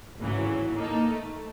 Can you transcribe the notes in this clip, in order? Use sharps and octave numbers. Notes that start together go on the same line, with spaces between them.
G#1 D2 A2 C#3 E3 F#3
A#3 D#4 A4
A3